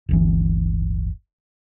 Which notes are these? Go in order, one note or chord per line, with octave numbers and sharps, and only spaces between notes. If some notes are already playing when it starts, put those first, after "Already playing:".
D1 G1 E3